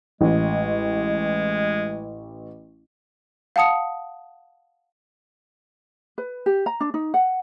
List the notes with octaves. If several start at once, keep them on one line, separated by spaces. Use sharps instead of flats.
A1 G#3
F5 F#5 A5 D#6 C#7
B4
G4
A#5
D4
D#4
F#5